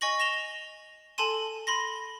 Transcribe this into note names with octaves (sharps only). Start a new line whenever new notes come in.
D#5 G#5 C#6 A#6 F#7
A#6 E7 F7 G7
A4 G#5 A5 C6 D#7
B5 C6 A#6